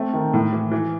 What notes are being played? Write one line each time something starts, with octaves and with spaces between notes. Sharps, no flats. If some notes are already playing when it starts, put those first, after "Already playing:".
Already playing: A3 C4
D#3
A2
E3
E3